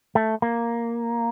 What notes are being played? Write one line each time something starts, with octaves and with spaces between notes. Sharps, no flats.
A3
A#3